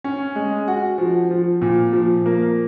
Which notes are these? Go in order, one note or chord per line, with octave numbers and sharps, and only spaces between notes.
C#4
G#3
F#4
F3
F3
A#2
F3
A#3